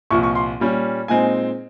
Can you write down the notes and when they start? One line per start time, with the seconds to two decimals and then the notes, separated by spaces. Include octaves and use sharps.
0.11 C2 A#2 F3 C#6
0.23 C#6
0.35 C6
0.60 A#2 G3 C#4
1.08 A#2 G#3 C4 D#4 G#5